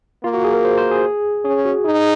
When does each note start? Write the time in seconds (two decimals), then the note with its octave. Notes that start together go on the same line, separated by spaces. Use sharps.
0.24 A#3 F4
0.34 F#4
0.44 G#4
0.54 A#4
0.65 C5
0.78 C5
0.91 G#4
1.44 C#4 G#4
1.65 F#4
1.85 D#4 G#4